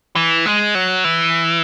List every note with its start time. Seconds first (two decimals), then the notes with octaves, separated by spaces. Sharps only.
0.16 E3
0.46 G#3
0.75 F#3
1.04 E3